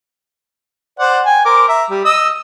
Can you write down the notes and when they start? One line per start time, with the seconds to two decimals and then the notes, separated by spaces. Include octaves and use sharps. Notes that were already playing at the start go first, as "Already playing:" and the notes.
0.99 C5 D5 F#5
1.25 G5 G#5
1.45 A#4 C5 D6
1.68 E5 A#5
1.90 G3
2.05 D#5 D#6 E6